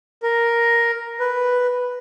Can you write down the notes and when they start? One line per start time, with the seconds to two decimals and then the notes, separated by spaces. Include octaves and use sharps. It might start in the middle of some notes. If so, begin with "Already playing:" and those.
0.23 A#4
1.20 B4